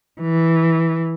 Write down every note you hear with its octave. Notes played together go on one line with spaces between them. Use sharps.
E3